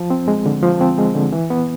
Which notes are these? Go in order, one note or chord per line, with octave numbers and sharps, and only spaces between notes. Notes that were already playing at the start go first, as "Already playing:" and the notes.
Already playing: F3
C4
G#3
D3
F3
C4
G#3
D3
E3
B3